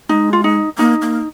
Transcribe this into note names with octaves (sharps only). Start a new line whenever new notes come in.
G#3 D#4
F4
D#4
A#3 D#4
A#3